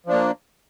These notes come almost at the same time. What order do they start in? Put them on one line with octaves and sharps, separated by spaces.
F3 D4 A#3